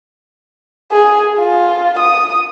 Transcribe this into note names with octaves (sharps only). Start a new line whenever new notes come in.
G#4
F4
D#6